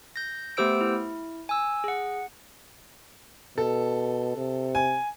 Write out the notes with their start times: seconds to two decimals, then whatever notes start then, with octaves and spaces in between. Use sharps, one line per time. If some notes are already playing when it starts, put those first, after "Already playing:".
0.16 G6 A#6
0.57 A3 B3 G4 C5 E6 D7
0.81 E4
1.49 G#5 E6
1.84 G#4 F#5
3.58 B2 A4
4.36 C3
4.75 G#5